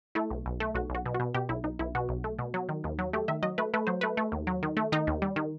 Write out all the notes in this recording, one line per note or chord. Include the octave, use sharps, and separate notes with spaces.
A3 E4
B1
B1
A3
B1 F#4
B1 F#4
B2
F#4
B2
B2 G4
B1 E4
B1 D#4
B1 E4
B2 F#4
B1
A3
B2
F#3
D#3
D#2
F#3
A3 G4
D#3 E5
F#3 D#5
A3 B4
A3 B4
F#3 C5
A3 B4
A3
D#2
F#3
D#3
A3
D#3 D#4
D#2
G3
D#3